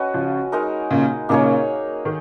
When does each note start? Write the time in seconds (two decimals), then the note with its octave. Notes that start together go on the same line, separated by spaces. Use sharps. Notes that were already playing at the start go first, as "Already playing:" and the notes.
Already playing: C#4 F#4 B4 D#5
0.14 C#3 F3
0.52 G#3 D#4 A#4
0.91 A#2 C#3
1.29 A#2 C#3 A#3 D#4 G#4 C#5
2.05 D#3